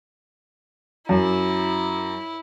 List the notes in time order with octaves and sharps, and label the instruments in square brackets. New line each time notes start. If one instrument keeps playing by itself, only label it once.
[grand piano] F#2 [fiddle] E4